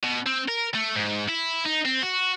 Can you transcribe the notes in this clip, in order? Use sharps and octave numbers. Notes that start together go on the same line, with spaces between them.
B2
C4
A#4
A3
G#2
E4
D#4
C4
F#4